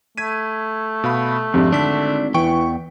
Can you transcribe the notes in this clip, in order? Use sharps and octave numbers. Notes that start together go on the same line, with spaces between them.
A3 G#6 B6 D#7
B2 F5 B5
F2 G#2 C3 D4
G#1 D3 D4 B6
E2 E3 G5 C#6